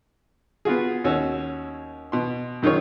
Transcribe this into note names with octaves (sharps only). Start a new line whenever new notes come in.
B3 F4 F#4 G#4
D#2 C#4 F#4 E6
B2 C6
F#2 D#3 F4 G#4 C#5